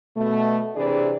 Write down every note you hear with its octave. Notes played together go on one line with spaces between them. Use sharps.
B2 A3
C3 E3 D4 G#4 B4 D5